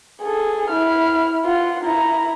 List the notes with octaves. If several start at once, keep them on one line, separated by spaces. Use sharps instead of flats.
G#4 A4
E4 F6
F4 F#5
E4 A#5